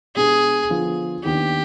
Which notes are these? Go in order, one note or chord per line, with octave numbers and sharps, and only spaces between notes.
B2 G#3 B3 D4 G4 G#4
D3 F3 B3 F4
D#2 D#3 B3 D4 G4